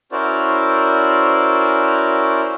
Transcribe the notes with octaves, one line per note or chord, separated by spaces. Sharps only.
C#4 E4 F#4 A#4 C5 D5